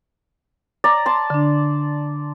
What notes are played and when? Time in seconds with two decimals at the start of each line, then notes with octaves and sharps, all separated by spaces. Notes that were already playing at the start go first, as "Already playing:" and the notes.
0.84 D5 A#5
1.06 A5 C6
1.30 D3 D4